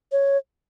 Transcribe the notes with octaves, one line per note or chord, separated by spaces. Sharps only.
C#5